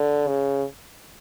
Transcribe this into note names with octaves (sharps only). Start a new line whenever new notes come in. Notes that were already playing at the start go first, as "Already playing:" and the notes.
Already playing: D3
C#3